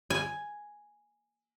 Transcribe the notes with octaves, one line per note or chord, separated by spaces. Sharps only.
G#5